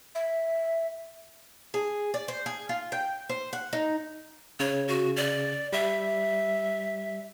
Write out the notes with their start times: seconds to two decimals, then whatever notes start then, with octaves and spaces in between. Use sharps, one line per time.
0.15 E5
1.74 G#4
2.14 D5
2.28 C5
2.46 G#4
2.69 F4
2.92 G5
3.29 C5
3.53 F#5
3.73 D#4
4.60 C#3 C#5
4.88 F#4
5.16 D5
5.73 G3 E5